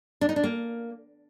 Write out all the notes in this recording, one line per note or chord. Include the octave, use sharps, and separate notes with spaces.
D4
D#4
D4
A#3